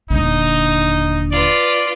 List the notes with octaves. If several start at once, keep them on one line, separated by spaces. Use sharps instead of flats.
D#1 D3 D#4
F4 B4 D5